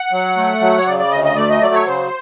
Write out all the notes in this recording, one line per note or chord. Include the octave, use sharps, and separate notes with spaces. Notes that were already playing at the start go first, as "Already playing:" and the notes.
Already playing: F#5
F#3
A3
F#3
C#5
C#3 D5
D5
D2 D#5
D#5
A3 D5
D#5
F#3 D5
C#5
C#3 C5